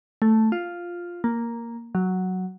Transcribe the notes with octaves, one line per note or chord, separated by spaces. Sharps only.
A3
F4
A#3
F#3